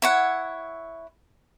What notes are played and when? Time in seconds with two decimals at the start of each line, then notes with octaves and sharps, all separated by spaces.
0.02 E4 C#5 F#5